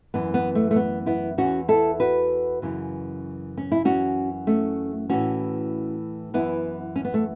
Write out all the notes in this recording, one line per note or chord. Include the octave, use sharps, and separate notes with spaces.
F#2 E3 B3
B3
A3
A3
B3
B3 E4
E2 E3 C#4 F#4
E4 A4
F#4 B4
F#2 C#3 E3
C#4
E4
F#2 E3 C#4 F#4
A3 C#4
A2 E3 C#4 F#4
F#2 E3 B3 E4
C#4
B3
A3